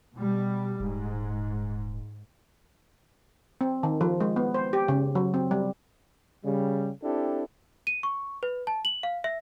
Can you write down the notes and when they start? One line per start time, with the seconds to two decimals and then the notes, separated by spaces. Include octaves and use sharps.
0.15 B2 G3
0.80 D#1 G#2
3.61 C4
3.83 D#3
4.01 F3
4.21 G#3
4.36 B3
4.54 C5
4.73 G4
4.88 C#3
5.15 F#3
5.34 C4
5.51 G3
6.44 C#3 G3
7.03 C4 D4 E4 G4 A4
7.87 D#7
8.03 C#6
8.43 B4
8.67 A5
8.85 F#7
9.03 F5
9.24 E5